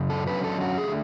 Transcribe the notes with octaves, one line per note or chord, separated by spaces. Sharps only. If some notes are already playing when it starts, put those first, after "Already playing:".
Already playing: F#2 C#3
A4
D3 F#3 C#4 B4
A4
F#4
D3 A3 G#4